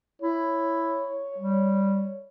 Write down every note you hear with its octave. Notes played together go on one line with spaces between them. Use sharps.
E4 C#5
G3